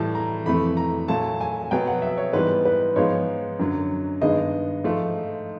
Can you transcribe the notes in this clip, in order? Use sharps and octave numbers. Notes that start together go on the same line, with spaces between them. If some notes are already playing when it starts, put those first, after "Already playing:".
Already playing: A2 E3 G3 A5
A#5
F2 C3 E3 A3 B5
A#5
A#2 F#3 A3 A5
G#5
B2 F#3 B3 G5
F#5
E5
C#5
G#2 E3 G3 B3 B4
B4
G#2 F3 G#3 B3 C#5
F#2 D3 F#3
G2 D#3 G#3 B3 D#5
G#2 F3 A3